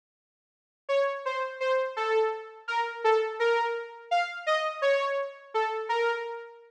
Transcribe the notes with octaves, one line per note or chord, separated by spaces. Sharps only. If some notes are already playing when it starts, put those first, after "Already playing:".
C#5
C5
C5
A4
A#4
A4
A#4
F5
D#5
C#5
A4
A#4